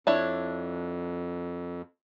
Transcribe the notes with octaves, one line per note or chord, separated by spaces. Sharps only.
F2 D4 E4 C#5